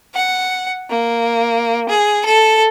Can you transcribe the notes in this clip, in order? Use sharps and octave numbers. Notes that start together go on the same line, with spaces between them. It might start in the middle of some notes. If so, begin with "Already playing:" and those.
F#5
A#3
G#4
A4